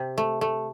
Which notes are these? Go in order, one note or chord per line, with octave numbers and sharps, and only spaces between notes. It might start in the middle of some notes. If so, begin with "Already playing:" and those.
Already playing: C3 G4
A3
A3